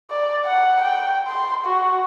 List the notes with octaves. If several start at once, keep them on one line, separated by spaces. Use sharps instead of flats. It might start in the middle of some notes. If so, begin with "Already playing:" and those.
D5
F#5
G5
C6
F#4